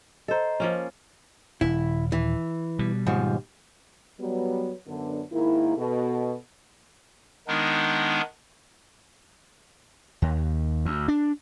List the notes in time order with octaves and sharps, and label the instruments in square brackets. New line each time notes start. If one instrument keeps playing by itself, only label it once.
[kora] A4 C5 [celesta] D#5 A#5
[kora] F3 A#3 C#4
[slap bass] D#1 [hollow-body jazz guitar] E4
[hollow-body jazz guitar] E3
[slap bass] B2 G3
[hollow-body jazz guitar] D#2 G#2 F3
[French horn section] F#3 G3 B3
F#2 D3 B3
G#2 D#3 A#3 E4
B2 A4
[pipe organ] D#3 G#3 B3 D4 D#4 A#4
[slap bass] D#2
D2
D4